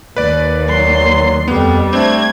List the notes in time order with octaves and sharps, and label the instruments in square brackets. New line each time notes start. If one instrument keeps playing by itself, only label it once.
[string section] D#2 [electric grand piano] B4 D5
[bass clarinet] F#3 [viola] C6
[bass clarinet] F2 [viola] G3 [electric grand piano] B3
[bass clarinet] A3 [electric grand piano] C4 D4 [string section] G#6